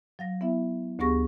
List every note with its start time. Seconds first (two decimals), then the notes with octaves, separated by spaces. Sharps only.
0.19 F#3 F5 A#6
0.41 B3 E4 E5
0.99 D2 B3 G4 G#4 C#6 A#6